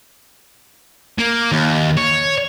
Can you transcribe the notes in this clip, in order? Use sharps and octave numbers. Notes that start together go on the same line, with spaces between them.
A#3
D#2
C#5